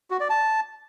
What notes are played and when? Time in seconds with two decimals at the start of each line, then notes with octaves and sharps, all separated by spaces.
0.11 F#4
0.20 D5
0.30 A5